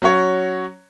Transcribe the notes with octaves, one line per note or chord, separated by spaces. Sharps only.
F#3 C#4 F#4 C#5